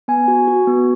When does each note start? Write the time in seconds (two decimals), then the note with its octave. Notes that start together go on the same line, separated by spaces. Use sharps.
0.08 B3 G#5
0.28 F#4
0.48 F#4
0.67 B3